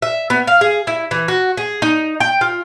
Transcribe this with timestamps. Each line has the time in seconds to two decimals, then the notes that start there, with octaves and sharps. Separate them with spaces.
0.02 E5
0.30 B3
0.47 F5
0.61 G#4
0.87 E4
1.11 E3
1.28 F#4
1.57 G#4
1.82 D#4
2.20 G5
2.41 F4